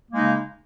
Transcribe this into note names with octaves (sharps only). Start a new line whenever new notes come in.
C#3 G#3 A#3 D#4